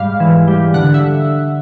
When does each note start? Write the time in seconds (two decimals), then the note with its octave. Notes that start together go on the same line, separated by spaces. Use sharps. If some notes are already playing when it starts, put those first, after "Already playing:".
Already playing: G#2 G3 G#3 F5
0.20 E3
0.48 G3
0.74 D3 F#5
0.94 E5